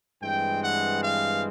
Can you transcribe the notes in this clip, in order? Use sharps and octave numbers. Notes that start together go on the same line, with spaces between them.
G2 E3 G#3 C4 G5
F#5
F5